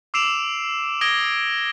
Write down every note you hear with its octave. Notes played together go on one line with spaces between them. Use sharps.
D6 E6 C7 D7 E7 F7
D#6 G#6 A#6 D7 G7